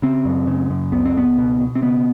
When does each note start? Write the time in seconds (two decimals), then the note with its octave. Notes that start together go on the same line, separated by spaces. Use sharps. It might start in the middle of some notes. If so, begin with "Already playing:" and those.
0.02 C#3 C4
0.25 F#2
0.47 C#3
0.70 F#2
0.92 C#2 B3
1.05 C4
1.16 C#2 B3
1.38 B2
1.60 B2
1.75 C4
1.82 C#3 B3